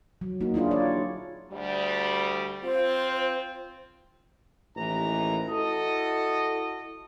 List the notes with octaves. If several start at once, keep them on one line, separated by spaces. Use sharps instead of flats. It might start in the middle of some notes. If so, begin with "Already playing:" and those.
F#3
A#3 D#4 F#4
D4 E4 F4 G#4
F4 C#5 D5
D2 G3
C4 F4 C5
A1 D#2 E3 A#5
E4 F#4 A4 D#5